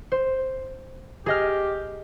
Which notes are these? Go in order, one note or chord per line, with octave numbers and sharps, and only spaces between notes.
C5
G4 G#4 D#5 F6